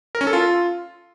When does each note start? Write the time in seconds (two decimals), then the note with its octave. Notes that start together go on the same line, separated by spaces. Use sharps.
0.15 A#4
0.21 C#4
0.27 A4
0.33 F4